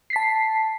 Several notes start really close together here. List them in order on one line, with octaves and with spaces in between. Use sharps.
C7 B6 A5